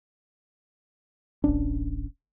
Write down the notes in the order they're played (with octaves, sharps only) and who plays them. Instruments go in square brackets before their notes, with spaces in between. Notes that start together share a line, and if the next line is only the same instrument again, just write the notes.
[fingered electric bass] D1 A1 C#4 D4